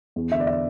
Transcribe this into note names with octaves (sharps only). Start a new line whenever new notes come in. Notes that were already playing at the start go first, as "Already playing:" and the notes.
E2
D3 E5
D5
E5